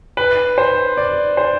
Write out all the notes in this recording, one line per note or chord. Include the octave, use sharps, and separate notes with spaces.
B4
C5
D5
C5